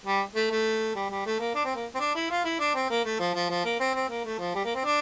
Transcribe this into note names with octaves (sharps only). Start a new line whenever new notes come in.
G3
A3
A3
G3
G3
A3
A#3
D4
C4
A#3
C4
D4
E4
F4
E4
D4
C4
A#3
A3
F3
F3
F3
A#3
C4
C4
A#3
A3
F3
G3
A#3
C4
D4